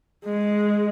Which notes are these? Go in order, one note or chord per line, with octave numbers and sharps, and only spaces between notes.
G#3